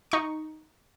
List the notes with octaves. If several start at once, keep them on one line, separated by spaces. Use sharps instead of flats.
D#4 C#6